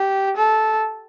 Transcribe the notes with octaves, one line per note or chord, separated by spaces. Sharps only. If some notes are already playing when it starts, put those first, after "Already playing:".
Already playing: G4
A4